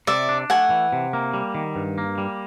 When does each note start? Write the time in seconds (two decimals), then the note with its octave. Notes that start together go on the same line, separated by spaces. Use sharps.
0.07 C3 D5 E5
0.29 D4
0.50 A3 F#5 G#5
0.70 E3
0.93 C3
1.13 A#3
1.34 G3
1.55 D#3
1.76 G2
1.98 A#3
2.18 G3